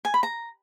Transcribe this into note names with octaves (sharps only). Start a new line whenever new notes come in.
G#5
B5
A#5